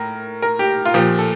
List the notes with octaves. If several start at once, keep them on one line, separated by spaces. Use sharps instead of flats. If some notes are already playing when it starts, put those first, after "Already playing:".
Already playing: A2 A#4
A#4
G4
F4
A#2 F3 G4
A4